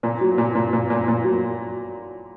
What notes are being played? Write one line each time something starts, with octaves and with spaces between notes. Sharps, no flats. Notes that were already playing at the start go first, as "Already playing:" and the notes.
A#2
F#3
A#2
A#2
A#2
A#2
A#2
F#3